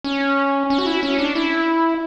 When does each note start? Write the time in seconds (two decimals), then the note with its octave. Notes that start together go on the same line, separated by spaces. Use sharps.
0.04 C#4
0.70 C#4
0.78 F#4
0.86 E4
1.03 C#4
1.18 D4
1.35 E4